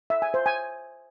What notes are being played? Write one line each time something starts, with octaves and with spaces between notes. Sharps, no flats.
E5
G#5
C5
G#5